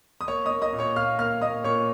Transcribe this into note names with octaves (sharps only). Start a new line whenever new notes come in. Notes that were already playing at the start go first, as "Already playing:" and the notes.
D#6
A#3 C#5 C#6
A#3 D#5 D#6
D#5 D#6
A#2
C#5 C#6
A#2 F5 F6
A#3 F5 F6
A#3 D#5 D#6
A#2 C#5 C#6